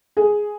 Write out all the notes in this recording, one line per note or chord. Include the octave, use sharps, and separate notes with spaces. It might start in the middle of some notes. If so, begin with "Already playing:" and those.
G#4